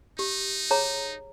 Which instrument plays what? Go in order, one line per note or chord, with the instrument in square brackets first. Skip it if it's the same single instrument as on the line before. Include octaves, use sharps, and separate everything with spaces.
[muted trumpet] D#4 [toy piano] G4
[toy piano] G#4 C#5 A#5